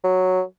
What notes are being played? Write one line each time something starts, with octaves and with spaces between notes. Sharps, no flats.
F#3